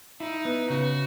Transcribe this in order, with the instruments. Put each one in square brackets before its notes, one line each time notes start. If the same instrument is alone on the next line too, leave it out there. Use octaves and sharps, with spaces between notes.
[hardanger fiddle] D#4 [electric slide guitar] E4
[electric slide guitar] B3
[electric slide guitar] C#3 [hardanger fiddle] F#4